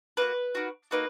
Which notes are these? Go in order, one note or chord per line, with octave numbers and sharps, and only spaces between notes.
A#3 D#4 F#4 B4
A#3 D#4 F#4
A#3 D#4 F#4 B4